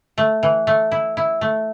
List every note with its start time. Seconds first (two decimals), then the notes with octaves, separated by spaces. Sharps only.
0.18 A3
0.43 E3
0.67 A3
0.92 E4
1.17 E4
1.41 A3